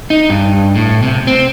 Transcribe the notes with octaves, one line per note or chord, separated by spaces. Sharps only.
D#4
G2
A2
C3
C4